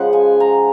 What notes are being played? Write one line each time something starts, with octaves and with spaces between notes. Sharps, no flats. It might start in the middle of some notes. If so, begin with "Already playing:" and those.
Already playing: C#3 F3 G#3 F#5
G#5
A#5